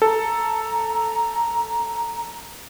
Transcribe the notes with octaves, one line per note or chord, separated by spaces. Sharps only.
A4 A#5